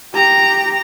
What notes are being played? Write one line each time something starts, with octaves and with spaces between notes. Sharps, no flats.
G4 A#5